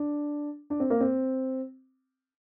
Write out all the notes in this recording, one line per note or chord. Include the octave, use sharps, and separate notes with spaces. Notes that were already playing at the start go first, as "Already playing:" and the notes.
Already playing: D4
D4
C4
A#3
C4